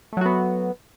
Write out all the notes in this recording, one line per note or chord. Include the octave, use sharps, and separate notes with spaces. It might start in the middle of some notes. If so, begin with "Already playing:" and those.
F#3 A3 B3 F#4